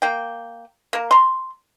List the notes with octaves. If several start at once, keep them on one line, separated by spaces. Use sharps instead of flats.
A#3 G5
A#3 A#4
A#5 C6